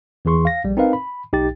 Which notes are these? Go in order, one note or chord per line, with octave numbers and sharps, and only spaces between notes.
E2 E3 G#4 C6 C#6
F5 A#6
A#1 G3
C4 D#4 A#4 B4 F5
B5
B1 D#4 G4 G5 A6